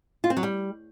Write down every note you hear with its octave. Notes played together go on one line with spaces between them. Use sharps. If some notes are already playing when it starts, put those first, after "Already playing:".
F4
C4
F#3
G3